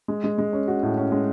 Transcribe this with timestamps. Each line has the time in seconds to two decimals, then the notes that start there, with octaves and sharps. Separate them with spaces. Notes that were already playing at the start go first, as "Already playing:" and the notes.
0.08 G#3
0.24 G#3
0.38 G#3
0.53 C#4
0.68 F#4
0.83 A2
0.97 C#4
1.12 G#3